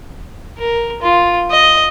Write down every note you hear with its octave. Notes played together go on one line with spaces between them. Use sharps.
A#4
F4
D#5